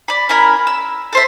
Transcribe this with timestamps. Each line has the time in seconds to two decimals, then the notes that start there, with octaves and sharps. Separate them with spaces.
0.08 D5 B5
0.29 C#4 E4 A#4 B5
0.67 E6
1.13 A4 C5 E5